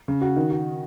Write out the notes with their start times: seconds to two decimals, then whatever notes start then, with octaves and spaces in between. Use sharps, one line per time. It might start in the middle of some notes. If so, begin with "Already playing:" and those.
0.08 C#3
0.21 F#4
0.36 D#3
0.50 F#4